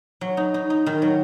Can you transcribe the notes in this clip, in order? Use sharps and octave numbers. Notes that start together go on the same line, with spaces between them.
F#3
D#4
D#4
D#4
D#3
F#3